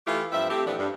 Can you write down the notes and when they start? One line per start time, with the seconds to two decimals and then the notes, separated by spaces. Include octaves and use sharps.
0.07 E3 A3 E4 F4 G4
0.32 G2 F3 C4 E5
0.50 A3 C4 E4 G4
0.67 A2 E3 F3 B3 D4 G4
0.79 G2